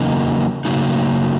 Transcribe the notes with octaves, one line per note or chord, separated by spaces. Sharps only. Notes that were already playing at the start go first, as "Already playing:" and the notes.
Already playing: E2 C#3 F#3 A#3 D#4
C#3 F#3 A#3 D#4